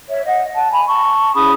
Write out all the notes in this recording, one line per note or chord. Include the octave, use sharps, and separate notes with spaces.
C#5 E5
D#5 F#5
F#5 A5
G#5 B5
A5 C#6
C#4 E4 G#4 B5 D#6